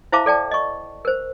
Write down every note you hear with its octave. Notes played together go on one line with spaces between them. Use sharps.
E4 C5 E5 F5 A5 D6
A4 D5 G5 A5
D#5 C#6
A#4 C5